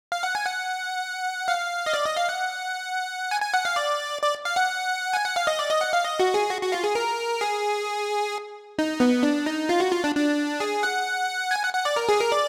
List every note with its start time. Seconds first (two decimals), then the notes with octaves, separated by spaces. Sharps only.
0.12 F5
0.23 F#5
0.35 G#5
0.46 F#5
1.48 F5
1.86 D#5
1.94 D5
2.05 D#5
2.17 F5
2.29 F#5
3.31 G#5
3.42 G#5
3.54 F#5
3.65 F5
3.76 D5
4.22 D5
4.45 F5
4.56 F#5
5.13 G#5
5.24 F#5
5.36 F5
5.47 D#5
5.59 D5
5.70 D#5
5.81 F#5
5.93 F5
6.05 D#5
6.20 F#4
6.34 G#4
6.50 F#4
6.61 F#4
6.72 F4
6.84 G#4
6.95 A#4
7.41 G#4
8.79 D#4
9.00 B3
9.23 D4
9.46 D#4
9.69 F4
9.80 F#4
9.92 F4
10.04 D4
10.15 D4
10.60 G#4
10.83 F#5
11.51 G#5
11.63 F#5
11.74 F#5
11.85 D5
11.96 A#4
12.09 G#4
12.20 A#4
12.32 D5